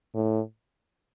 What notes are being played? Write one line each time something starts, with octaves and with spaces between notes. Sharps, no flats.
A2